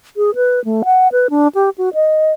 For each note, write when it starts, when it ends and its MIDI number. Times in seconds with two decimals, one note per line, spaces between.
0.17 0.34 68
0.35 0.63 71
0.65 0.83 57
0.85 1.08 78
1.12 1.27 71
1.30 1.48 62
1.55 1.70 67
1.78 1.89 66
1.94 2.32 75